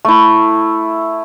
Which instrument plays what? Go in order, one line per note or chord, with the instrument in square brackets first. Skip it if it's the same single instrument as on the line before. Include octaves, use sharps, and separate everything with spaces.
[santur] A3 E4